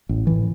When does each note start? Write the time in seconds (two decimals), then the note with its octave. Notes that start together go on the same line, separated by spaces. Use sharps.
0.09 A1
0.27 A2 E3